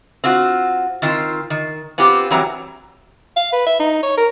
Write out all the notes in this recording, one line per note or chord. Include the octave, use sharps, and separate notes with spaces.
C4 F4 F#4
D#3 C4 F4
D#3
B3 C4 F4 G4
E3 F#3 G3 C4 A#5
F5
B4
E5
D#4
C#5
A#4